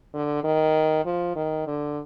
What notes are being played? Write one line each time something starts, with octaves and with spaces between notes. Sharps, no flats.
D3
D#3
F3
D#3
D3